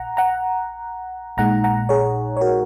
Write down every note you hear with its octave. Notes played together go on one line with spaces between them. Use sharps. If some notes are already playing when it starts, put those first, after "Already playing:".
Already playing: A#1 F#5 A#5
F#5 A#5
A#1 A#2 G#3 D#4 F#5 A#5
F#5 A#5
G#4 C#5
C#5
F#4 A#4